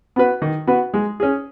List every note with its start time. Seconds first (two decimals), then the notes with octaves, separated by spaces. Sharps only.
0.16 B3 F#4 B4
0.42 D#3
0.67 B3 F#4 B4
0.94 G#3
1.20 C#4 G#4